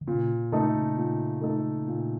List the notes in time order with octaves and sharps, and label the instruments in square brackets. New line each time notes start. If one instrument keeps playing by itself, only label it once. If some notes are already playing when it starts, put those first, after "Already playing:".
[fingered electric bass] D#3
[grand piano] A#2 [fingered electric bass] C#3
[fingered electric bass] C#3 [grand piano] A3 D#4 A4
[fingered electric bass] C#3
[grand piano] A#2
A3 D#4 A4
A#2